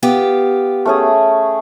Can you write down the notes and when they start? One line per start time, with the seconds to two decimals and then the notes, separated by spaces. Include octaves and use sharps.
0.03 B3 F4 G4
0.85 A3 C#4 G#4